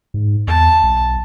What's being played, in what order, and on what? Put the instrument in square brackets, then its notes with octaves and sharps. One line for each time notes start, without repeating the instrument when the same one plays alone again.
[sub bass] G#2
[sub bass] E2 [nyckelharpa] A5
[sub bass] B1